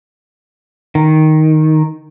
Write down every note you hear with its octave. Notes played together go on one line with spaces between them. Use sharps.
D#3